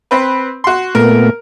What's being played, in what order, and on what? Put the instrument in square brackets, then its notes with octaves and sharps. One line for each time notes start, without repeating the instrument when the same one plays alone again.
[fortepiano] C4 B4
F#4 C6
[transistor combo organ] A#2 A3 B3 [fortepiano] A#4